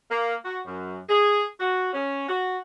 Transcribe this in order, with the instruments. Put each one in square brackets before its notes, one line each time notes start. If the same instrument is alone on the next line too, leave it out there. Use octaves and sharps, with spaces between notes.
[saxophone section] A#3
F#4
F#2
G#4
F#4
C#4
F#4